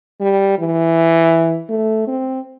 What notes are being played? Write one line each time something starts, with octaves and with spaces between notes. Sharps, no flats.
G3
E3
A3
C4